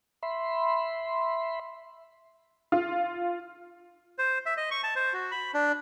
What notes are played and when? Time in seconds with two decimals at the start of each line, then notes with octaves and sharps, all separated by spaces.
0.23 E5 B5 C6
2.72 F4
4.18 C5
4.46 E5
4.57 D#5
4.71 C#6
4.84 A5
4.96 C5
5.13 F#4
5.31 B5
5.54 D4